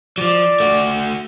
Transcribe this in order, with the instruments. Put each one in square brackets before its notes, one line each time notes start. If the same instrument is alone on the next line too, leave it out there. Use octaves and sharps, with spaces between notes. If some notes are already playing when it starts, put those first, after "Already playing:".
[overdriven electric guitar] F3 F#3 [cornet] D5
[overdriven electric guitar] A3 F#4